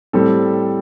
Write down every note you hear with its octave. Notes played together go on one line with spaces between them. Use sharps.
A2 G3 C4 A4